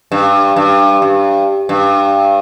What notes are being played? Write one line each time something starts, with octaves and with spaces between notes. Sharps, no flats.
G2
G2
G2
G2